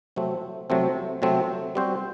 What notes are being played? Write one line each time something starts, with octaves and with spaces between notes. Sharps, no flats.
C3 F#3 A3 C4
C3 F#3 A3 C4
C3 F#3 A3 C4
G3 C4 F#4 C5